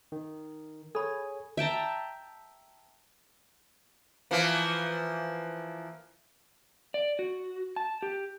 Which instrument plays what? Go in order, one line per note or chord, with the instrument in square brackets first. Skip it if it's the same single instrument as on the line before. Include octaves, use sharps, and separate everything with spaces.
[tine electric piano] D#3
[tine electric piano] G#4 C#5 G#5 [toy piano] A4 B5
[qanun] E5 G5 A5 A#5
[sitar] E3 F3 A#3
[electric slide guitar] D5
F#4
A5
G4